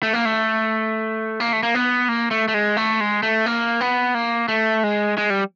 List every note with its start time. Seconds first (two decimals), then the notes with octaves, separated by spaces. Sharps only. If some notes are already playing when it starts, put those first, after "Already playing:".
0.03 A3
0.13 A#3
0.25 A3
1.40 A#3
1.53 A3
1.63 A#3
1.75 B3
2.09 A#3
2.31 A3
2.48 A3
2.54 G#3
2.77 A3
3.01 G#3
3.23 A3
3.46 A#3
3.81 B3
4.14 A#3
4.48 A3
4.84 G#3
5.18 G#3
5.30 G3